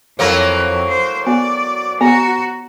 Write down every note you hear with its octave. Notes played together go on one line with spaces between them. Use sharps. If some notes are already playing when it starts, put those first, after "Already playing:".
F2 F#3 A#3 C4 E4 A4 C#5
C5
B3 F#4 D5
B3 F#4 A#5 C#6